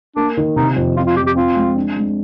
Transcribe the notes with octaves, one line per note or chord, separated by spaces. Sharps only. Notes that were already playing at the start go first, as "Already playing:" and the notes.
A#3 D4
D#3
C3 D#4
F2
C4 F4
F4
F3 G4
G4
C4 F4
G#3
D4
G#3